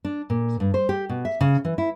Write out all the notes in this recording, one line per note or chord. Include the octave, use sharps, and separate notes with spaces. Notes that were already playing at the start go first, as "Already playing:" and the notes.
D4
A#2
G2
C5
G4
B2
E5
C#3
E3
E4